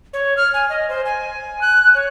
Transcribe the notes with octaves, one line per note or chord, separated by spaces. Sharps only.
C#5
F6
G#5
D#5
C5
G#5
F#6
C#5